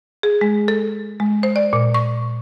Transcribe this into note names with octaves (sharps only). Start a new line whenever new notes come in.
G#4
G#3
A4
G#3
C5
D5
A#2
C#6